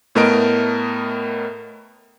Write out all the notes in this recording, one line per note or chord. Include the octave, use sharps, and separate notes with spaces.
A2 A3 B3 A#4 D#5 D7